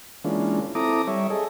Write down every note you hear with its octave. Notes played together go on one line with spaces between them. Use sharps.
E3 G#3 A#3 C#4 D4 F4
C4 E4 A4 A#5 D6 D#6
G3 C#5 E5
G#4 A4 D#5